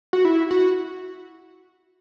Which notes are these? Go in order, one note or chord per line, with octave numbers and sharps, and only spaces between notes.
F#4
E4
F#4